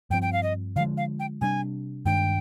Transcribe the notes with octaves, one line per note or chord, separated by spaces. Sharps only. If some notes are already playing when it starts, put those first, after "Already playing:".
G2 F3 C4 G5
G5
F5
D#5
D3 F3 G#3 F5
F5
G5
C3 G3 D4 G#5
G2 D#3 G#3 D4 G5